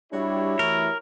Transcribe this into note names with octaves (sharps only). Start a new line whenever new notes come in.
G3 D4 E4 F#4 G4 C#5
E3 A3 A#4